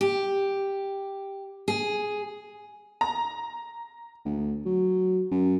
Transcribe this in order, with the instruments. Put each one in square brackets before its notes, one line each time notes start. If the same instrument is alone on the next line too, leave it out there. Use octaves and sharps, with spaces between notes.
[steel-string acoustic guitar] G4
G#4
[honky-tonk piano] A#5
[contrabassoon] D2
F#3
F#2